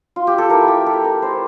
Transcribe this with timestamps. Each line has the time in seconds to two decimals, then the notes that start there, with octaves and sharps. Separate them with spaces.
0.16 F4
0.27 G4
0.38 A4
0.50 A3 E4 A#4
0.68 G4
0.86 A4
1.04 A#4
1.22 A3 E4 C5